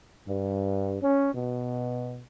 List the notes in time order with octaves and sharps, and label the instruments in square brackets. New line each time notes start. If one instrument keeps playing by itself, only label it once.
[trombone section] G2
C#4
B2